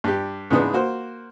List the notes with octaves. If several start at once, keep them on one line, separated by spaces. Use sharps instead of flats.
G2 G4
G#2 C#3 E3 B3 D4 B4
A#3 F#4 C5